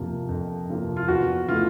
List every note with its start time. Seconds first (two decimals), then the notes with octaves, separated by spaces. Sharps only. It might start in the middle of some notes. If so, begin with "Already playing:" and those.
Already playing: F2 C3 F3 A#3
0.29 F2
0.69 C3 F3 A#3
0.96 F4
1.08 E2 F#4
1.48 C#3 E3 A3 F4